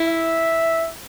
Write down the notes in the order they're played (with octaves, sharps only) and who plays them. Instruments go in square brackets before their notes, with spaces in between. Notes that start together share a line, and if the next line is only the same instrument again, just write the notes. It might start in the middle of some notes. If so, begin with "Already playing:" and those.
Already playing: [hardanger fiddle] E4
[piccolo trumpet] E5